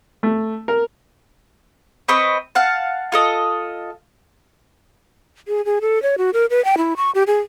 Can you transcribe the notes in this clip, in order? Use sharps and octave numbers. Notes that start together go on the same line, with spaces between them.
A3
A#4
C4 B4 D#5 C#6
F5 F#5 A5
F4 A4 D#5
G#4
G#4
A4
C#5
F#4
A#4
B4
G5
E4
C#6
G4
G#4